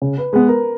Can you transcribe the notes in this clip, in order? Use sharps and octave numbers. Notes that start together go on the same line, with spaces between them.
C#3
B4
G#3 B3 B4
A#4